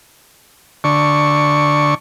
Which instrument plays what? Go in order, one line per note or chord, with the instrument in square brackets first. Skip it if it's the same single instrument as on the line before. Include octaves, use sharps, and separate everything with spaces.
[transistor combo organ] D3 C#6